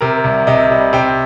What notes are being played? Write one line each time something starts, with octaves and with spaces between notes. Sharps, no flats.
C3 A#4
C2
C3 D#5
G3
C3 G5